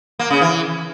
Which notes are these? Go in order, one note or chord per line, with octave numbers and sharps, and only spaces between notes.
A#3
C#3
E3